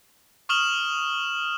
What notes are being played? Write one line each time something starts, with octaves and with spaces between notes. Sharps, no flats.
C#6 D#6 F6 E7 F#7